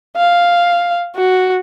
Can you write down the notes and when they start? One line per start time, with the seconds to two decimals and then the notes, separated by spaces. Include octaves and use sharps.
0.17 F5
1.17 F#4